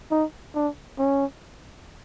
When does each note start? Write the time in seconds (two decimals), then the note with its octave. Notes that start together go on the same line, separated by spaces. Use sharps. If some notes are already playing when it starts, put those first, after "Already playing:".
0.11 D#4
0.55 D4
0.99 C#4